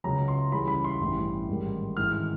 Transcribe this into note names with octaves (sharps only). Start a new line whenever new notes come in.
C#2 C#3 F#3 A#5
C6
C#2 C#3 E3 G3 B5
B5
C6
A1 G2 E3 G3
A1 G#2 D#3 G3
G#1 G#2 E3 F6
F6